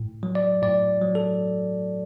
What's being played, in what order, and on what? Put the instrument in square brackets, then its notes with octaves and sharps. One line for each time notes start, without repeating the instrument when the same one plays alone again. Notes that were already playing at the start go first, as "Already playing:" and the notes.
Already playing: [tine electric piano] A2
F#3
D5
A2 D5
F#3
A4